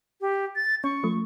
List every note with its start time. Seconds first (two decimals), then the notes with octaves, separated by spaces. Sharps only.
0.21 G4
0.56 A6
0.84 C#4 C#6
1.03 F3 A3